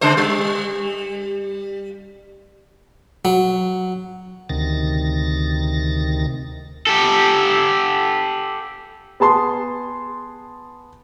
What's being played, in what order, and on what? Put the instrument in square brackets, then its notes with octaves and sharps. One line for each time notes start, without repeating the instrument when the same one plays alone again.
[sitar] C#3 G#3 C5
G3
[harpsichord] F#3
[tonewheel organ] D2 C3 D#3 A6 A#6
[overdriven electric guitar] G4 A4
[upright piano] B3 G#4 A5 C6